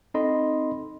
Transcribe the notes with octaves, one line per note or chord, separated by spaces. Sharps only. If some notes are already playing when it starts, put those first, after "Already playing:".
C4 D#4 A4 D#5 B5 C6